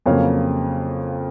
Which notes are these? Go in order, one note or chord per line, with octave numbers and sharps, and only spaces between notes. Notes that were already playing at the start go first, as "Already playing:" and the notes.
F2 C#3 F#3 A#3 C#5 F5